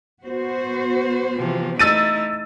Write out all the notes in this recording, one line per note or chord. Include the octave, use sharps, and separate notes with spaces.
B3 F#4 C5
C3 E3 F3
A3 D#4 E4 E6 A6 D#7